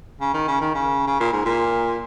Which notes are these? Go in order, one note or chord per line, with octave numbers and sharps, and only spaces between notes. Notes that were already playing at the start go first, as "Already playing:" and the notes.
C#3
D#3
C#3
D#3
C#3
C#3
A#2
G#2
A#2